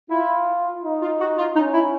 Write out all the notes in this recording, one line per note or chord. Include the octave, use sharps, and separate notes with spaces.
E4 F4
D#4
F4
F#4
F4
C#4 D#4
E4